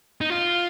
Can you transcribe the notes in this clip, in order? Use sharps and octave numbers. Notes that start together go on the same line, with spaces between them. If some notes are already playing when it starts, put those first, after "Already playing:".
D#4
F4